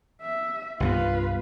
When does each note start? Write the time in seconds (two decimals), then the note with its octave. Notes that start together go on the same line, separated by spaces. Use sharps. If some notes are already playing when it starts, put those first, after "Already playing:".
0.21 E5
0.80 C2 G2 B3 F4 B4